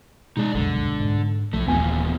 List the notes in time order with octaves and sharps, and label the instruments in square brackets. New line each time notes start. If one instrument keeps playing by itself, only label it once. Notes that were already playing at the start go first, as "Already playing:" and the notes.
[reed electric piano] B2 G#3 [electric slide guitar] D#4 D5
[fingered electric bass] F1 C2 F#2 [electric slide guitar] D3
[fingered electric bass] G#2
[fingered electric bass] B1 F3 [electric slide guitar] A2 A3
[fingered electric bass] D#1 [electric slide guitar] E2 A#2 F3 [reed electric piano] B3 G#5